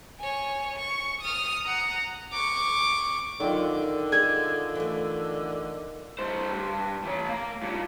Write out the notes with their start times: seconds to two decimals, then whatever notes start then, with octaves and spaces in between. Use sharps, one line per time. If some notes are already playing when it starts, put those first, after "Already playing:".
0.19 C#5 G#5
0.76 C#6
1.21 D#6 F6
1.65 F#5 A#5
2.33 C#6 D6
3.40 F#2 D3 D#3 F4
4.12 G#4 A4 D5 G#6
4.75 E3 A3
6.19 G2 C5
6.55 G2
7.03 E3 C#5
7.29 A#3 A#5
7.62 G2 A#2